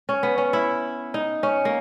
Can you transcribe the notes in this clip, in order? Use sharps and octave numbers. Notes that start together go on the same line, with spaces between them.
C#4
B3
C#4
E4
D#4
C#4
A#3